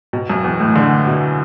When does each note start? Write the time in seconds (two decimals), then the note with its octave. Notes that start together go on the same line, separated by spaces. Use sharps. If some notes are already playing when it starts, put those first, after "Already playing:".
0.13 B2
0.30 F#2
0.44 E2
0.60 A2
0.76 D3
1.07 B2